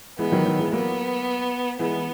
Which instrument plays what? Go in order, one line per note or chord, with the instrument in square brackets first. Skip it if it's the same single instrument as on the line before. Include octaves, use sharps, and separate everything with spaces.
[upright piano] E3 G#3 [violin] B3
[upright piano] D#3 F#3
D#3 F#3
E3 G#3
[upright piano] F#3 A#3 [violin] B3
[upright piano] E3 G#3 [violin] B3